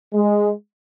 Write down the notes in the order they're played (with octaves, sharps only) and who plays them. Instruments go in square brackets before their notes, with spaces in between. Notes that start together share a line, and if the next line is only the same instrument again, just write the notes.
[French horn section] G#3